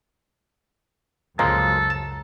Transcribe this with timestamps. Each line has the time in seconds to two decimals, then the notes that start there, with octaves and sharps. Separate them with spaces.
1.39 C#2 F#2 C#3 F3 G#3 A#3 A4 A#5
1.90 A5